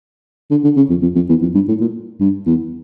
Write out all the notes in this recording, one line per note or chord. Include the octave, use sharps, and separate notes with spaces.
D3
D3
C#3
F2
F2
F2
E2
F2
G2
A2
A#2
G2
E2